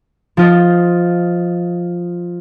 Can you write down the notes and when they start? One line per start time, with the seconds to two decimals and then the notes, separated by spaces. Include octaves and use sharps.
0.37 F3 F4 D#5